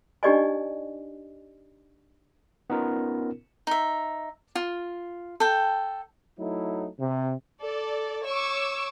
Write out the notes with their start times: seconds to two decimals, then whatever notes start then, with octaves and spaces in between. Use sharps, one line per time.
0.23 D4 D#4 G4 D5 D#5 G#5
2.70 B3 C#4 D#4 F4 A#4
3.67 D#4 E5
4.55 F4
5.40 A4 G5
6.39 F#3 A3 D#4 E4
6.99 C3
7.61 A4 D5
8.25 C#5 C#6 D6 E6